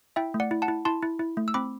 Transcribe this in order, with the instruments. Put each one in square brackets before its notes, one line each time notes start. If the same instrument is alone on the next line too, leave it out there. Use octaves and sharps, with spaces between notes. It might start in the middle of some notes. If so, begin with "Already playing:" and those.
[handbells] E4 E5 G5
A3
D5 F#5
E4
F#5 A5
E4
E4 A5 C6
E4
E4
A3
E6
C4 B5 D6